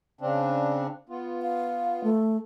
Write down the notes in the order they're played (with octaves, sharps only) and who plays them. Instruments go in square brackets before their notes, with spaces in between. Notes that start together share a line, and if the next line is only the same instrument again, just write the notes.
[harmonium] C#3 C4 D4
B3 F4
[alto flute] F5
A3